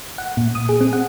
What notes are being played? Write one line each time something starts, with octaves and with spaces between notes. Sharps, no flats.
F#5
A#2
D#6
G#4
C4
F#5